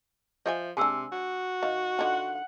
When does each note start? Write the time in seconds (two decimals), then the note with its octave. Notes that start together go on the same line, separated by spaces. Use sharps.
0.46 F3 D#5 E5 G#5
0.77 C3 D4 G#4 G#5 E6
1.12 F#4
1.63 D#3 D#5 F5
1.99 D3 D#4 F4 F#5